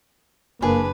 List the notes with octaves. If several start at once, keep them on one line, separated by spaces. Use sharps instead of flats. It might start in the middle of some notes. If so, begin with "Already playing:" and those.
F#1 A#3 D4 G#4 B4